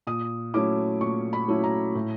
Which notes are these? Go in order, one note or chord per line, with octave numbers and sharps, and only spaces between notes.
A#2 D#6
F#3 A3 C#4 E4 D6
A#2 C#6
B5
F#3 A3 C#4 E4
A#5
A2